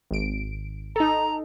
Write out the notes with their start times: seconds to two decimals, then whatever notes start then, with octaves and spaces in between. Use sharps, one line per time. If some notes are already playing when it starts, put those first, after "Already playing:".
0.11 G#1 D7
0.96 D#4 A4 A#5